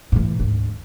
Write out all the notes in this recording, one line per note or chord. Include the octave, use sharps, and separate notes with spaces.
A2 E3
D2 G#2